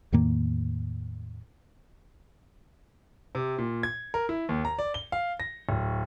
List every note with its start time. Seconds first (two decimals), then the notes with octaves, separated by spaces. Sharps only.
0.12 E2 A2 D#3 A#3
3.35 C3
3.58 A#2
3.83 G#6
4.14 A#4
4.29 E4
4.49 D#2
4.65 A#5
4.79 D5
4.94 G7
5.12 F5
5.40 A#6
5.69 D1